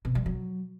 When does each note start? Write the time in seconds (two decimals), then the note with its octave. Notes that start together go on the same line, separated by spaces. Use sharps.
0.05 B2
0.15 G3
0.26 F#3